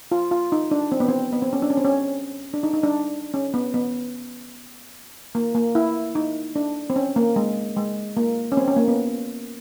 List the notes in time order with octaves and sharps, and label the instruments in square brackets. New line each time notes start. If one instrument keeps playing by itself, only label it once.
[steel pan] F4
F4
D#4
D4
C4
B3
C4
B3
C4
C#4
D4
C#4
C4
C#4
D4
D#4
D#4
D4
C#4
B3
B3
A#3
A#3
E4
D#4
D4
C4
C#4
A#3
G#3
G#3
A#3
C#4
C4
C#4
A#3
B3